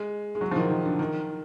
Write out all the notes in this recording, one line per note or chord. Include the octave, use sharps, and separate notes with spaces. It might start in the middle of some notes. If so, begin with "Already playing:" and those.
Already playing: G#3
G#3
F#3
F3
D#3
D#3
D3
D#3